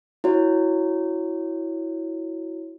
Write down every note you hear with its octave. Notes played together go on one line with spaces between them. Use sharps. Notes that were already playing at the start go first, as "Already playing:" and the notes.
E4 F#4 C#5